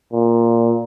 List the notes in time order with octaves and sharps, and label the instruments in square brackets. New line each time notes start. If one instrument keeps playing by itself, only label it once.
[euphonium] A#2